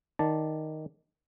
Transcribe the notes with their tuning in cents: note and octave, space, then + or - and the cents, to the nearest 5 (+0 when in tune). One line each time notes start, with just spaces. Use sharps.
D#3 +0 D5 +0 A5 +0